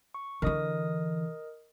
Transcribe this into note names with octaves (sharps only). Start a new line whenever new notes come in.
C#6
D3 E3 A#4 D#5 D#6